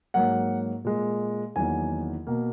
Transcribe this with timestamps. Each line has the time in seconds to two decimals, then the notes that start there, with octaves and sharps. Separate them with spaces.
0.14 G#2 F#3 A#3 F#5
0.84 A#2 G#3
1.56 E2 D#3 F#3 A#3 G#5
2.27 B2 A#3